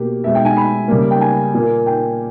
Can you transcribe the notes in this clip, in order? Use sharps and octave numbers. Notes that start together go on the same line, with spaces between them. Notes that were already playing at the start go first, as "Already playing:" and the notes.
Already playing: B2 A#3 G4
B2 G#3 E5
G5
G#5
B5
C#3 G3 A#3
G5
G#5
A#2 A#3
G5